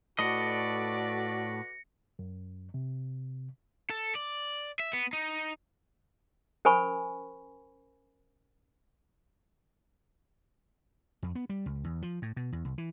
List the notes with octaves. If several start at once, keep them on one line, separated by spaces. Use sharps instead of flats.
A2 F#4 A4 B4 D5 D#5 A#6 C#7
F#2
C3
A4
D5
E5
B3
D#4
C#4 A#4 C5 G#5 B5 C#6
F2
B3
G3
C#2
E2
F3
A2
B2
E2
C2
E3